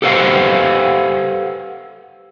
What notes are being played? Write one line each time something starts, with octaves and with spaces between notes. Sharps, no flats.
G4 A4 B4 C5 F5 F#5